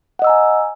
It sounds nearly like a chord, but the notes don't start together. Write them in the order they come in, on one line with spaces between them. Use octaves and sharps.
F#5 D#5 E6 A#5 G#5